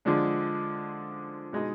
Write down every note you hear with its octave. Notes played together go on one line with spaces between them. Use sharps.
D3 F3 G#3 D4
B2 G#3 D#4